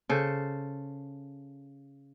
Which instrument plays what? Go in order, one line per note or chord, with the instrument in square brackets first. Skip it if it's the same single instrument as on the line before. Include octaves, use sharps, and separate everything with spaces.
[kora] C#3 A4 C5